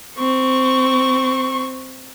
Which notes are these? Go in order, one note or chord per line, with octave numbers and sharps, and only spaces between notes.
C4 C#6